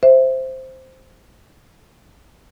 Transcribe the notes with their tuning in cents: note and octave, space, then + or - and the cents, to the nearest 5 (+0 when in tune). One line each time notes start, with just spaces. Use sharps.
C5 +0 E5 +0